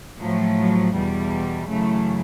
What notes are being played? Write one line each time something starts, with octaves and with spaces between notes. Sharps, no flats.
A2 F3 F#3
F#3
E2 B2 G3
F#2 C#3 E3 A3